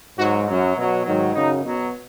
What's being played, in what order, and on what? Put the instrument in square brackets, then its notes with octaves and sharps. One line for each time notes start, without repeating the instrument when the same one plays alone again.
[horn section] G#2 F#4
F#3
F#2 F#3
B2 F#3
G#2 D#3 F#3
F#2 C#3 F#3 D#4
B2 F#3